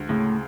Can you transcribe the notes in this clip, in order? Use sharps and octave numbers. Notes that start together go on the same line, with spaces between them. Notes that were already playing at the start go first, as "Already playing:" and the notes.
Already playing: D2 G#3
A2 C#3